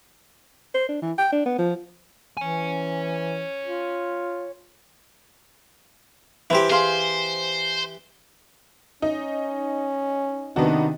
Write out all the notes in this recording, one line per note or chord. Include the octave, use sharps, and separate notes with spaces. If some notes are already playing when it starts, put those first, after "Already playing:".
C5
D4
E3
G5
D4
B3
F3
E3 C#5 G#5
F4
E3 E4 G4 C5
G#4 C5 F5 C6
C#4 D#4
C3 D#3 B3 D4 D#4 F#4